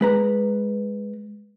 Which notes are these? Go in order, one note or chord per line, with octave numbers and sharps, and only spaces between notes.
G#3 B4 A#5